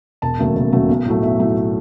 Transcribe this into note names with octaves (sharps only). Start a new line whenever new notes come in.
E1 A5
D#2 C#3 F#3 A3
E1
D#2 C#3 F#3 A3
B1
A2 F#3 A3
B1 E5
A2 F#3 A3